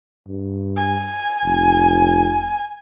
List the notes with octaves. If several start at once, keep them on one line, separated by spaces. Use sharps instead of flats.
G2
G#5
F1